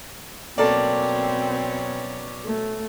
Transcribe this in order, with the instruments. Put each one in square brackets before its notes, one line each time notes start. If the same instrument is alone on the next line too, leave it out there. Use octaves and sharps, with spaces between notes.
[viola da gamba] B2 F#3 C#4 [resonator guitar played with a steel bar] A#3 A4 [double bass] C4 [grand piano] D5
[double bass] A3